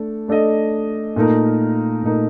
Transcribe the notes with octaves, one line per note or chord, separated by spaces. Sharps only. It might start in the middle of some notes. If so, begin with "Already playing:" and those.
Already playing: A3 D4 A4
A3 D4 A4 D#5
A#2 A3 D#4 A#4
A#2 A3 D#4 A#4